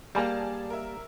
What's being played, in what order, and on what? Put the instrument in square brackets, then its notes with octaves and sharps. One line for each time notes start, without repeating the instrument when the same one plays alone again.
[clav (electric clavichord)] G3 A#3 [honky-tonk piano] G#4 D5 A5
[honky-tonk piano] A#4 E5